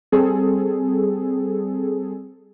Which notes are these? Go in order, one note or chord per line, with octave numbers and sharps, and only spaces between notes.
G3 C4 G#4 A4